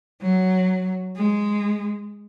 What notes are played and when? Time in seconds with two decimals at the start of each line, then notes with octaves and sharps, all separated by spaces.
0.22 F#3
1.17 G#3